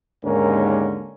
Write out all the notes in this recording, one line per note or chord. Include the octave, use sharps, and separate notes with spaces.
D#2 G#2 D3 C#4 A#4